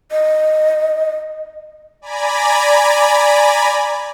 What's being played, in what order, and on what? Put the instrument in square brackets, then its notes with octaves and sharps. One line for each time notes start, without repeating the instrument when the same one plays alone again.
[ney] D#5
[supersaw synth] D5 G#5 A#5 B5